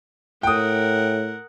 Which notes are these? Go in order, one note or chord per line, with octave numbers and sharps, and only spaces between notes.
A2 A#4 F#5 G5 D#6